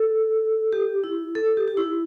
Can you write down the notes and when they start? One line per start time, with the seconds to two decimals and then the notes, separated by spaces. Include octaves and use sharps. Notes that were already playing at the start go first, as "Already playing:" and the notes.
Already playing: A4
0.73 G4
1.04 E4
1.35 A4
1.57 G4
1.68 G4
1.77 E4